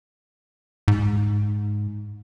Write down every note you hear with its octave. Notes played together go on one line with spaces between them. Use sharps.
G#2